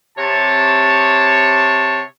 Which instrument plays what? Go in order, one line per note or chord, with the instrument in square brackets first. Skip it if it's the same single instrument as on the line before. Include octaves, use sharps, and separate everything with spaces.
[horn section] C3 C#5 A5